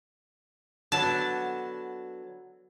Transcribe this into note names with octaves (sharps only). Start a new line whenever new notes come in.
D3 F#3 B3 A5